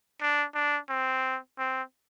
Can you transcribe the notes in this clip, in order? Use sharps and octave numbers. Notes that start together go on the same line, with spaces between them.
D4
D4
C4
C4